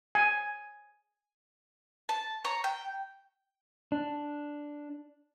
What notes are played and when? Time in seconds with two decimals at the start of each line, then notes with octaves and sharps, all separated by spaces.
0.15 G#5
2.09 A5
2.45 C#5 A#5
2.64 G5
3.92 D4